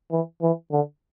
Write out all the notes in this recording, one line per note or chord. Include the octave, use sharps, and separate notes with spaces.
E3
E3
D3